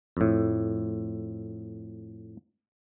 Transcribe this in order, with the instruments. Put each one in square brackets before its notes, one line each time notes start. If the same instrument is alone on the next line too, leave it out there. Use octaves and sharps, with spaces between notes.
[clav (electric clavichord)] F2 A2